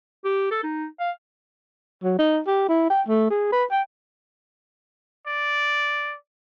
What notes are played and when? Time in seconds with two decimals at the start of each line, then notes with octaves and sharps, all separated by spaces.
0.24 G4
0.51 A4
0.63 D#4
1.00 F5
2.03 F#3
2.19 D#4
2.47 G4
2.69 E4
2.90 G5
3.08 A3
3.31 G#4
3.52 B4
3.71 G5
5.27 D5